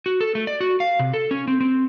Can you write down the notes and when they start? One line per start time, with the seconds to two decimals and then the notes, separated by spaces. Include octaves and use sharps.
0.06 F#4
0.21 A4
0.35 A3
0.47 D5
0.61 F#4
0.80 F5
0.99 C3
1.13 A4
1.31 C#4
1.48 C4
1.61 C4